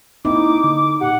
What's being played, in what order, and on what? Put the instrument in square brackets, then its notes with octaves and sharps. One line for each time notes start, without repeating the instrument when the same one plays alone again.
[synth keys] A#3 C4 E4 [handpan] D#4 [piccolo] D6
[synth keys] D3
[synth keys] A#2 G4 [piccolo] F#5